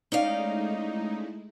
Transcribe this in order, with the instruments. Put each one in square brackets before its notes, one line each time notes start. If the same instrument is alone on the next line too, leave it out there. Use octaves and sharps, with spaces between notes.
[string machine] G#3 A3 E4 [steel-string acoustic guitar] C#4 D5 F5 [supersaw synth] D#4